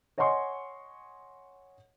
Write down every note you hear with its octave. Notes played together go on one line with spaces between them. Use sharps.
C#5 D#5 F#5 G#5 C6 C#6